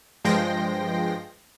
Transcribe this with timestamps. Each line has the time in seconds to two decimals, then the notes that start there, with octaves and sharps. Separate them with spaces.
0.25 G2 F3 G#3 G5 C6 A#6